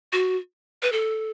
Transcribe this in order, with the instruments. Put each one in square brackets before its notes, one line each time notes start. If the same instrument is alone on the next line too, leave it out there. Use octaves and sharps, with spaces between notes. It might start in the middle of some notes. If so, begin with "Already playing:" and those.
[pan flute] F#4
B4
A4